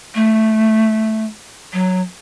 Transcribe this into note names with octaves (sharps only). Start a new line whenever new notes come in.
A3
F#3